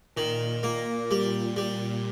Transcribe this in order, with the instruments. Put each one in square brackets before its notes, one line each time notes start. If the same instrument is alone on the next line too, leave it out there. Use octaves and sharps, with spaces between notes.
[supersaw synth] A#2 [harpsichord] D#3
[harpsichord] A#3
G3
G3